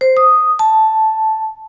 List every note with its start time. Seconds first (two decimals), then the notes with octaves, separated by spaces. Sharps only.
0.01 C5
0.17 D#6
0.59 A5